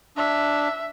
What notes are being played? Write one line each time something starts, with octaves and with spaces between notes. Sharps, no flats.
D4 E5